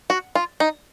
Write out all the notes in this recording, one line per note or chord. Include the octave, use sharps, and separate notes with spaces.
F#4
F4
D#4